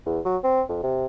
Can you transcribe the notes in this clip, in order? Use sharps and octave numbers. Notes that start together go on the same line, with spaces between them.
E2
F#3
C4
F2
C3